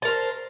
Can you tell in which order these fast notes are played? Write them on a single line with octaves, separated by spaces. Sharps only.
A5 A#4 C5